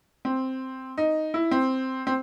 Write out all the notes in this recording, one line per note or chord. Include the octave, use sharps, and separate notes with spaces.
C4
D#4
E4
C4
C4